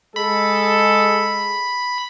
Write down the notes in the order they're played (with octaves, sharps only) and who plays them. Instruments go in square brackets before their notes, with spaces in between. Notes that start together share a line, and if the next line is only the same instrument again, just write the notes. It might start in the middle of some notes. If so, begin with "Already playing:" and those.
[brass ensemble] G#3 G#4 A4 [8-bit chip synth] B5